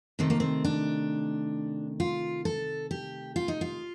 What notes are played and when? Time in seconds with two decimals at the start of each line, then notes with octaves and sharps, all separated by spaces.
0.19 C3 D#3 A3 C4
0.30 A#3
0.40 C4
0.65 D4
2.00 F4
2.45 A4
2.91 G4
3.36 F4
3.48 D#4
3.61 F4